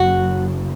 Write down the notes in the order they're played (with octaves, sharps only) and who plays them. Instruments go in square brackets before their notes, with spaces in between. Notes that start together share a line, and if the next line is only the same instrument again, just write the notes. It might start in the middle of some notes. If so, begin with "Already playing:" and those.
Already playing: [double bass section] F#1 F#2 C#3 [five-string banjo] F#4